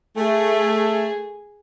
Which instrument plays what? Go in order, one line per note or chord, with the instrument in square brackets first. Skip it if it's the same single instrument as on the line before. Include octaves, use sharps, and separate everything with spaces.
[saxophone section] A3 [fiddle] G#4